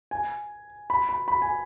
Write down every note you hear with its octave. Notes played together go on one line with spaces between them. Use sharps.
G#5
B5
B5
B5
G#5